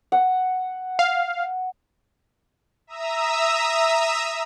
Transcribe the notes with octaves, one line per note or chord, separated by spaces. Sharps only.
F#5
F5
E5 A#5 D#6 E6